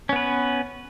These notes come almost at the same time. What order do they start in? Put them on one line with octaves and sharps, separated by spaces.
C#4 B3 B4